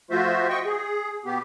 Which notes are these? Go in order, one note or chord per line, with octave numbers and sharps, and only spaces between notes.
F3 A3 F4 F#4 C5 E5
D#5 G5 C#6
G#4
B2 B3 G4